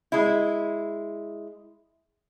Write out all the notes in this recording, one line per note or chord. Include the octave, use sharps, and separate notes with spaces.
G#3 E4